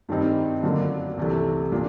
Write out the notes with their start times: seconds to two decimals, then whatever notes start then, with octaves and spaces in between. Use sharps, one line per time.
0.09 G2 D#3 G3 C4 D#4
0.63 F#2 D3 F#3 A#3 D4
1.17 C2 C3 E3 A3
1.72 A#2 F3 A#3 D4